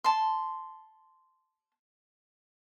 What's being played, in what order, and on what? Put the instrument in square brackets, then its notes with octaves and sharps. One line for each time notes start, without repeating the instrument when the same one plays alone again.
[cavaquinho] A5 C6